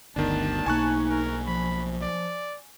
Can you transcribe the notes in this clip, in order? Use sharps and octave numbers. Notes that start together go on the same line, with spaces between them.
G1 D2 D#3 B3 D4 A5
B1 A#3 D#4 G#5 C#6 F#6
A#4
F3 B5
D5